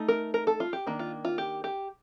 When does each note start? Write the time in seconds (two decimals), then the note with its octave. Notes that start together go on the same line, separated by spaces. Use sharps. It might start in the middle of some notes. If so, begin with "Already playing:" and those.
Already playing: A3 D#4
0.08 A#4
0.34 A#4
0.47 A4
0.60 F4
0.73 G4
0.86 D#3 A#3 D4
0.99 F4
1.25 F4
1.38 G4
1.64 G4